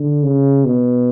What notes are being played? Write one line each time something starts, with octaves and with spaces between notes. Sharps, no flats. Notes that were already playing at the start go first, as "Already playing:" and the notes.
Already playing: D3
C#3
B2